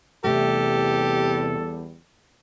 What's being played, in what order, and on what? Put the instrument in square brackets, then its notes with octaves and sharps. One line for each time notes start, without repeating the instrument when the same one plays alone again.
[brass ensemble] E2 G3 [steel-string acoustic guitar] C3 A3 [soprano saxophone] G4 [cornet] A4